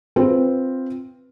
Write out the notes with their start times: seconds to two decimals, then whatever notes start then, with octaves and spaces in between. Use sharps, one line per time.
0.16 C4 F4 B4